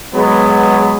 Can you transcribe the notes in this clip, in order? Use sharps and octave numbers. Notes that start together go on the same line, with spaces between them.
F#3 G#3 B3